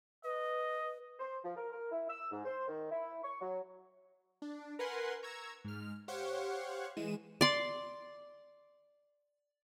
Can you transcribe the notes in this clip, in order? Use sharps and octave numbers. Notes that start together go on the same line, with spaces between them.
B4 D#5
C5
F3
A#4
A#4
E4
E6
G#2
C5
D#3
E4
C#6
F#3
D4
A#4 B4 F#5 G#5 C6
A#5 C#6 E6 G#6
G#2 F6
G4 C5 C#5 F5 F#5 C#6
E3 G#3 D#7 E7
D5 C6